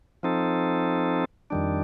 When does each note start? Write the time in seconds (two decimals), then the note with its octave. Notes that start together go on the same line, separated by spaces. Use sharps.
0.23 F3 C4 D#4 A4
1.50 F2 D#3 G3 D4